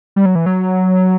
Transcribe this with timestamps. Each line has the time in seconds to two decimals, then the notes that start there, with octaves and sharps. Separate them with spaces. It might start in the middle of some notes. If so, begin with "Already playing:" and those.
0.16 G3
0.26 F#3
0.35 E3
0.46 F#3